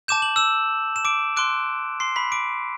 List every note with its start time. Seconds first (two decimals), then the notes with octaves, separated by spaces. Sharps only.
0.08 A5 D6 G6 E7
0.22 F#7
0.36 E6 E7
0.96 E7
1.05 D6 D7
1.37 C6 D6 F#6 D7
2.00 C6 C7
2.16 B5 B6
2.32 D6 D7